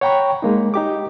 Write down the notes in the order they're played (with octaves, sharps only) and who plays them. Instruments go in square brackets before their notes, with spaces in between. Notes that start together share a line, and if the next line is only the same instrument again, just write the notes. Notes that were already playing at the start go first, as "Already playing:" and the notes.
[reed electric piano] C#5 F#5 G5 A#5 B5 C#6
G#3 A#3 D#4
D#4 G4 D6